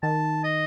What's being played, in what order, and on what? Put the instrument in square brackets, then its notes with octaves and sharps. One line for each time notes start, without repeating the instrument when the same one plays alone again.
[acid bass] D#3 [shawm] A5
[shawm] D#5